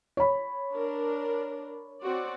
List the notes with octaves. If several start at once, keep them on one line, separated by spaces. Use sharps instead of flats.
C#5 B5
D4 A#4
C4 F#4 D5